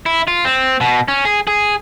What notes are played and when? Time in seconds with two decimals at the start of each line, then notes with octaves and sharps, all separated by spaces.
0.06 E4
0.27 F4
0.45 C4
0.81 B2
1.08 C#4
1.25 G#4
1.47 G#4